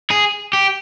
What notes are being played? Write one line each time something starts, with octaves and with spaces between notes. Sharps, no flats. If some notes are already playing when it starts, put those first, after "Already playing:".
G#4
G4